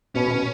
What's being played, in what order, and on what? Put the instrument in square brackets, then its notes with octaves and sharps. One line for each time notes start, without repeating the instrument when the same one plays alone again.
[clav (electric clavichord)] B2 [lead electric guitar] C#4
[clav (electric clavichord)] B2